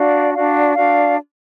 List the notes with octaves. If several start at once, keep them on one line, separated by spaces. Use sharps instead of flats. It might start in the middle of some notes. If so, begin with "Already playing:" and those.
Already playing: D4 F#4 D5 F5
D4 F#4 D5 F5
D4 F#4 D5 F5